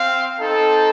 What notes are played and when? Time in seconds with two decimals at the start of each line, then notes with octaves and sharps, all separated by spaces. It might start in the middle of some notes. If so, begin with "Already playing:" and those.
Already playing: C4 F5
0.40 C4 D#4 A4